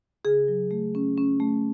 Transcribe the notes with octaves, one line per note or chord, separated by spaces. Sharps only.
C#3 G#4
F#3
A3
C#4
C#4
A3